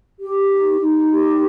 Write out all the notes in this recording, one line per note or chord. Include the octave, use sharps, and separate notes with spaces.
G4
D#4
D#4
G4